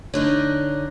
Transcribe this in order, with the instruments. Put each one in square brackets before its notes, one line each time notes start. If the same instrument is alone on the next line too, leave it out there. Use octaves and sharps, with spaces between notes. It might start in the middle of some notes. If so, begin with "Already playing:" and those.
[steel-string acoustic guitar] D3 D4 D#4 [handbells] C#5 F#6